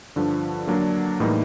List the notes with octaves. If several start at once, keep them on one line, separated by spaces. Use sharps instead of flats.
G2 D3 F3
D3 F#3 A#3 D4
A2 E3 G3 A#3 D#4